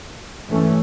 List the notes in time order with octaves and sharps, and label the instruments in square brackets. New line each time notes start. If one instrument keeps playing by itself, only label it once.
[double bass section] G2 E3 A3 C#4